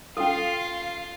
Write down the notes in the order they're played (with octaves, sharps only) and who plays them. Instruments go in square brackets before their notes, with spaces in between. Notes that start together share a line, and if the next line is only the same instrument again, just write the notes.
[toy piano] C#4 A4 [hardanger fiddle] F4 [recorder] F5